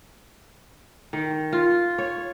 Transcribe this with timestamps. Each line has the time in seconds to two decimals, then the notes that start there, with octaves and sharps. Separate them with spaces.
1.13 D#3
1.53 F4
1.98 C#5